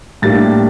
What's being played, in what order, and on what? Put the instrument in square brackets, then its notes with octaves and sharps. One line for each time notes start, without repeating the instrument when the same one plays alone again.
[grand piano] A2 G3 A#3 D4 A6